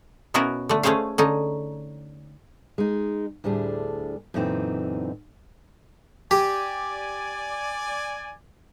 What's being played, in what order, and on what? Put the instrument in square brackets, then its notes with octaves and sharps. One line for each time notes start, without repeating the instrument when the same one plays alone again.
[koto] B2 B3 C#4 E4 F#4 A#4
D3 A3
A3 C#4 G#4 C5 C#5 F5
D3 C#4 D#4
[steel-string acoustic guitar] G#3 D#4
D2 A2 G3 D4 G#4
F#2 A#2 D3 E3 C4 D#4
[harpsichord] G4 [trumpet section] D5 G#5